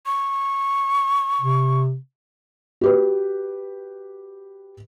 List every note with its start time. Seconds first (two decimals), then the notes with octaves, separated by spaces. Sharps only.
0.06 C#6
1.41 C3
2.81 F#4 G4 B4